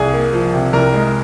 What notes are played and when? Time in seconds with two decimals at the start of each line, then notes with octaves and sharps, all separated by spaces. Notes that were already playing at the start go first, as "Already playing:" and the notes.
Already playing: C2 G#4 G#5
0.13 A#3
0.33 F3
0.53 C3
0.73 C2 A#4 A#5
0.94 G#3